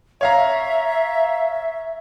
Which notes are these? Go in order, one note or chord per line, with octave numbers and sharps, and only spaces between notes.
C#5 E5 F5 A#5